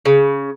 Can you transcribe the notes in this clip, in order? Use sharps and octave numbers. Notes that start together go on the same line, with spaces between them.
C#3